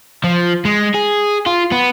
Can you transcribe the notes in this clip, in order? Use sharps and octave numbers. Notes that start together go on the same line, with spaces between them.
F3
G#3
G#4
F4
B3